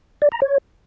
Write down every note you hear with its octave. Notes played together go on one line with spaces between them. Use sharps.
D5
A#5
C#5